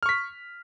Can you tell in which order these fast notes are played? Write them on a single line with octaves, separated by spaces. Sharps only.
F6 C#6 B6